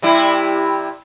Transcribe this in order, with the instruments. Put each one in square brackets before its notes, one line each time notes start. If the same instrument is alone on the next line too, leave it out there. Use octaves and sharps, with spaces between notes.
[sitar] C3 G3 E4